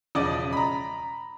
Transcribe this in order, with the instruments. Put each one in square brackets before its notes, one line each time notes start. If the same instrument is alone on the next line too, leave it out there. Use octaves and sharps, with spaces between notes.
[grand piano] E1 C#3 F3 D5 D#5 D6
A#5 B5